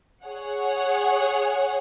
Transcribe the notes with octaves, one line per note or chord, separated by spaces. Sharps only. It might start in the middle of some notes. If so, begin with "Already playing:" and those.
G#4 C#5 F#5